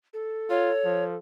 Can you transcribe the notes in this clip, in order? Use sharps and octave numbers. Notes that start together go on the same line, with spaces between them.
A4
F4 C#5
F3